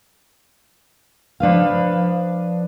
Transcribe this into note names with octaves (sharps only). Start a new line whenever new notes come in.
F3 D4 B4 F5